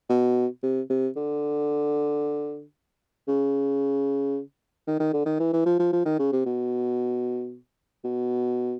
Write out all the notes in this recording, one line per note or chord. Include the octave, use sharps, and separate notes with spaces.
B2
C3
C3
D3
C#3
D#3
D#3
D3
D#3
E3
E3
F3
F3
F3
D#3
C#3
C3
B2
B2